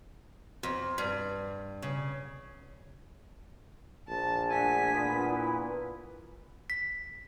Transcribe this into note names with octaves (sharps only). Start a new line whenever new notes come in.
F2
G2
C#3
A#1 A5
A3 D4 F#4 A4 G#5 B6
A#2 B3 G#4 C5
E4 B4 B5
B6